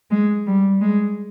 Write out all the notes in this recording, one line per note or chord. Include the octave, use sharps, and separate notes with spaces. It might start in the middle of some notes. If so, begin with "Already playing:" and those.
G#3
G3
G#3